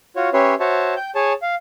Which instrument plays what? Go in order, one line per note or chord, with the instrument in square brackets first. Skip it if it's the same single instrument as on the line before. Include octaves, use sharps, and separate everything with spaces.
[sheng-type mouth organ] F4 F#4 C#5
C#4 G4 B4 C#5 E5 C6
F#4 C5 C#5 E5 A5
G5 G6
G#4 C#5 A5
F5